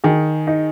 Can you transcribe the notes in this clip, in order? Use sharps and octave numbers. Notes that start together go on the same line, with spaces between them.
D#3 G#4
D#4